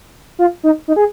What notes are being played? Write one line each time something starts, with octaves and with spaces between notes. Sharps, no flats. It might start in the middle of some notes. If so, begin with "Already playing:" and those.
F4
D#4
D#4
G#4